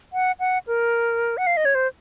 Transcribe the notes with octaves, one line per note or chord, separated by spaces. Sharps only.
F#5
F#5
A#4
F#5
F5
D#5
C#5
C5